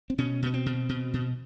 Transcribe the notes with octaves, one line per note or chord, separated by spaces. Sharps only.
C4
B2 C#4
B2 B3
C4
B2
B2
B2